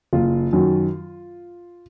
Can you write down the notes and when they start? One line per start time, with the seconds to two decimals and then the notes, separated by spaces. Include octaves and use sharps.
0.13 F#1 F4
0.53 F#2 D#3 F#3